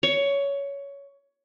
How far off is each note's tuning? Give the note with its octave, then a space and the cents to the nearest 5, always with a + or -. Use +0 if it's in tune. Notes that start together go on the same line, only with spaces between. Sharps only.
C#5 +15